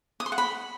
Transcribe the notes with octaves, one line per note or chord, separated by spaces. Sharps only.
D#6
C6
F#5
B5